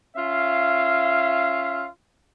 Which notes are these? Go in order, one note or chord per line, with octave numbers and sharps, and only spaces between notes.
C#4 F4 E5 F5